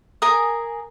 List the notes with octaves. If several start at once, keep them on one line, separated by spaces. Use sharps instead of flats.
G#4 A#4 G#5 D#6